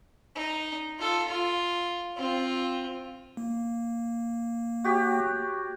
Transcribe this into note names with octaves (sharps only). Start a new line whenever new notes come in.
D#4
F4 A4
F4
C4 F4
A#3
F#4 G4 C#5